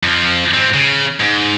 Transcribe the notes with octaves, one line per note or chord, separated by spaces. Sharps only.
F2 F3
G#2 C4
C#3
G#2